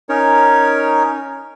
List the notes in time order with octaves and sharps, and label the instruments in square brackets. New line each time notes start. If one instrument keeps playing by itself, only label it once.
[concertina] C#4 D#4 A#4 C#5